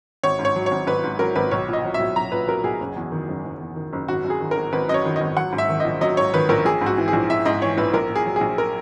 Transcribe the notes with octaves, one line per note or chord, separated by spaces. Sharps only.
G#1 C#5
G#2
C#5
F#3
C#5
G#1
G#1 B4
G#2
F#3 A#4
G#1 B4
B1 C#5
A#2 D#5
F#3
E5
B1
B1 A#5
A#2 B4
F#3 A#4
B1 G#4
F#1
E2
D#3
F#1
F#1
E2
D#3
F#1
G#1 F#4
F#2
G#4
D#3
A#4
G#1
G#1 B4
F#2 D#5
C#5
D#3
G#1 D#5
F#3 F#5
G#2
E5
D#3
D#5
A#1
F#3 D#5
G#2 C#5
D#3 B4
A#1 A#4
A#1 G#4
G#2
F#4
E3
G#4
A#1
A#1 E5
G#2 D#5
E3 C#5
A#1 B4
A#1 A#4
A#2
G#4
F#3
G#4
A#1
A#4